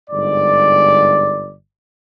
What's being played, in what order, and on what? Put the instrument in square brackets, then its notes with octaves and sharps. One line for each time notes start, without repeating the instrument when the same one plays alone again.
[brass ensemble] G1 G#2 D5